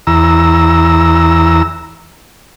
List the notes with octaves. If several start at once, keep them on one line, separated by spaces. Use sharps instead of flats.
E2 A#5 E6